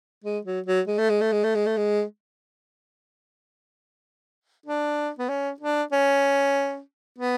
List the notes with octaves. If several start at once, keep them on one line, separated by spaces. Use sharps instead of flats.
G#3
F#3
F#3
G#3
A3
G#3
A3
G#3
A3
G#3
A3
G#3
D4
B3
C#4
D4
C#4
B3